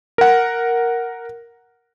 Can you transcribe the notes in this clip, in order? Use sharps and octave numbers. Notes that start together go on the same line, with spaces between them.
A#4 F#5